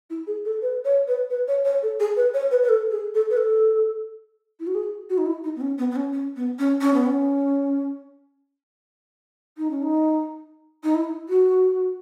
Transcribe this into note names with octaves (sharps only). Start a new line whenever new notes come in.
E4
G#4
A4
B4
C#5
B4
B4
C#5
C#5
A4
G#4
B4
C#5
B4
B4
A4
G#4
A4
B4
A4
E4
F#4
G#4
F#4
D#4
E4
D#4
B3
C#4
B3
B3
C#4
C#4
B3
C#4
C#4
B3
C#4
D#4
C#4
D#4
D#4
E4
F#4